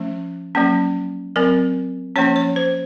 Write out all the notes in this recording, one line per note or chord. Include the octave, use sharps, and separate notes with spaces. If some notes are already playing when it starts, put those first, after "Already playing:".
Already playing: F3 A3 C#4
F#3 A#3 C#4
F#3 C4 A#4
F3 A#3 C#4 C#5
C#5
C5